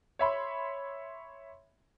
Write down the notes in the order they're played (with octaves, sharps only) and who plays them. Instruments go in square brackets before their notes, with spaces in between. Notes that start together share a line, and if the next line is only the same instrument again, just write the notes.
[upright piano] C#5 E5 B5 C6